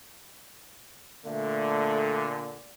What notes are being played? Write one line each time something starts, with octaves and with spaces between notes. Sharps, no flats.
A#2 D3 A3